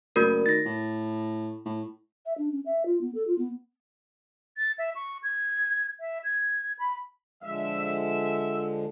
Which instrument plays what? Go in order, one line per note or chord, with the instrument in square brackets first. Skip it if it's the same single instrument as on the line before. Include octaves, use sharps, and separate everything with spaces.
[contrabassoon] F#1 [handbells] A3 F#4 A#4
[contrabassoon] D#3 [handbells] A6 A#6
[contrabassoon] A2
A2
[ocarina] E5
D4
C#4
E5
F4
B3
A4
F4
B3
[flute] A6
E5
C#6
G#6
E5
G#6
B5
[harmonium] D3 F3 G#3 [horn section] E5